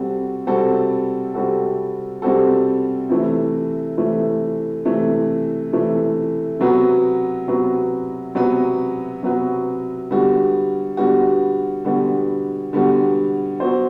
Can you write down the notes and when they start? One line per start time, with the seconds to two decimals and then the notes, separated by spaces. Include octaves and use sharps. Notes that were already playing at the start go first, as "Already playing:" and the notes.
Already playing: C3 G3 C4 F#4 A4
0.47 C3 G3 C4 F#4 A4
1.34 C3 G3 C4 F#4 A4
2.22 C3 G3 C4 F#4 A4
3.09 C3 E3 A3
3.98 C3 E3 A3
4.85 C3 E3 A3
5.73 C3 E3 A3
6.60 C3 F#3 B3 F#4 B4
7.48 C3 F#3 B3 F#4 B4
8.35 C3 F#3 B3 F#4 B4
9.23 C3 F#3 B3 F#4 B4
10.10 D3 G3 B3 F#4
10.97 D3 G3 B3 F#4
11.85 D3 G3 B3 F#4
12.73 D3 G3 B3 F#4
13.60 F#3 B3 F#4 C5